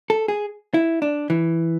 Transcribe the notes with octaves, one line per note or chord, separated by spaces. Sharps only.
A4
G#4
E4
D4
E3